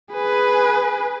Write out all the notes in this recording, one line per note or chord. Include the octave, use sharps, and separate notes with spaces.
G#4 B4